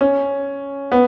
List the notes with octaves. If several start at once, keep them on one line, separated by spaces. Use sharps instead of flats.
C#4
B3